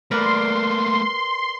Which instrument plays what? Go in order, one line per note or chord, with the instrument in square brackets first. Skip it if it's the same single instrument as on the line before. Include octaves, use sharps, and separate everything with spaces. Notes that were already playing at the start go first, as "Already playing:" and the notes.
[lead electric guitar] A3 A#3 [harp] A#4 B4 D5 [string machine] C6